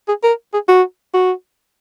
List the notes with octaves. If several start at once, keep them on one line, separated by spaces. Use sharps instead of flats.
G#4
A#4
G#4
F#4
F#4